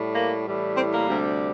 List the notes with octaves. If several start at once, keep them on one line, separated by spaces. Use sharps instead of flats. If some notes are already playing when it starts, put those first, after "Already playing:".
Already playing: A2 G3
A#3
A2 E3 G3
C4
A#3
D2 C3 G3